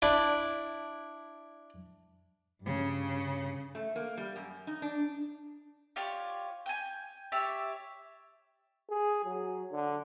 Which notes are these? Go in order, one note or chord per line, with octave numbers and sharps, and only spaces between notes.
D4 E4
G2 C#3
A3
A#3
G3
F#2
D#4
D4
F4 G4 C#5 D5
G5 G#5
G4 C#5 D5 E5
G#4
F#3
D3